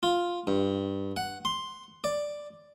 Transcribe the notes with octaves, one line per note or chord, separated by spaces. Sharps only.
F4
G2
F#5
C6
D5